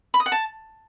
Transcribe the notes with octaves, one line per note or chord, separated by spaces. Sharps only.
B5
D#6
F#5
A5